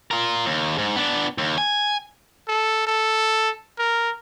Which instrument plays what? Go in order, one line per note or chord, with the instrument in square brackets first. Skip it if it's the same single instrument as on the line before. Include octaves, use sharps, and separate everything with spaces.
[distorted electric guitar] F4 A#4
D#2
G#2
B3 D4
D#2
G#5
[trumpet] A4
A4
A#4